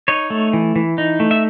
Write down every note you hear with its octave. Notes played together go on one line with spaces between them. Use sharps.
D#4 C#5
A3
E3
E3
D#4
A3
E5